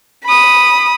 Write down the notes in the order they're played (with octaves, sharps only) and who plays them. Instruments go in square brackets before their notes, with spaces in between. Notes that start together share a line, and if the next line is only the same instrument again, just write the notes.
[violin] B5 D#6